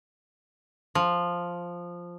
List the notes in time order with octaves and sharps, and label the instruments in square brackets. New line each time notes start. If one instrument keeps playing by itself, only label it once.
[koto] F3